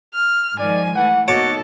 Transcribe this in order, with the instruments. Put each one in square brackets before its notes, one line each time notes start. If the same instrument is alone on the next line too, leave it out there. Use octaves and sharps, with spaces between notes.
[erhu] F6
[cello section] G#2 D#3 F3 [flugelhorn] D5 [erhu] G#5
[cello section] E3 A3 [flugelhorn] F#5
[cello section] A#3 B3 D#4 [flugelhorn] F#4 [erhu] A4 [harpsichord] C#5 A5 D6